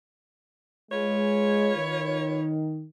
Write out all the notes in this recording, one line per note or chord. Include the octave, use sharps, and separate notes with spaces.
G#3 F4 B4 C#5
D#3